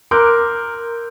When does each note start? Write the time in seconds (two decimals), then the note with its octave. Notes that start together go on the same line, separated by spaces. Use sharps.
0.11 A#4 C6 D6 E6 F#6 G6